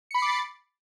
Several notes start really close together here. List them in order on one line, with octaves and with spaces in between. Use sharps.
C#7 B5 C7 D6 A6